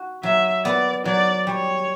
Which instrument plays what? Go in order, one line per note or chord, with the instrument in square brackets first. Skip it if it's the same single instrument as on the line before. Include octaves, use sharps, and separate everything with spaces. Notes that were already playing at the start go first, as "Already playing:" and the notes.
Already playing: [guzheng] F#4
[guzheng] F#3 [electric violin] E5
[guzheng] B3 [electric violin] D5
[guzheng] F#3 [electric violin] D5
[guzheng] G3 [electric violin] C#5